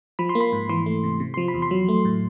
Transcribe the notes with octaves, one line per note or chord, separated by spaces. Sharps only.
F3 B5
C6
A#3
B5
G#2
E3 C6
A3
C3
C3
F3 C6
B5
E2
C6
F#3
A3
A2